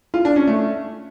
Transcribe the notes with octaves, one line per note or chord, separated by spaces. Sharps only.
F4
D4
C#4
A3